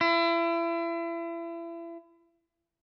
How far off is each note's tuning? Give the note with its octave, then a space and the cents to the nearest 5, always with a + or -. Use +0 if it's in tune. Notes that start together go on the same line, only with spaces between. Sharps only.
E4 +35